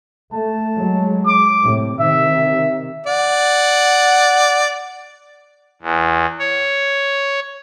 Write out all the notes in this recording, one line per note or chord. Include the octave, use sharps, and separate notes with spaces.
A3 A5
F#3 G#3
D6
A2 C3
C3 D#3 E5
D5 F#5
E2
C#5